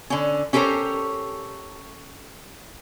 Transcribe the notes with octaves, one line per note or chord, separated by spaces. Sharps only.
D3 C#4
C#4 G4 A4 A#4 C5 C#5